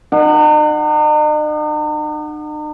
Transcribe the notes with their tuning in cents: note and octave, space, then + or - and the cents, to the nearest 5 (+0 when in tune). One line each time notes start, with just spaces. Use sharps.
D#4 -45 F#5 +0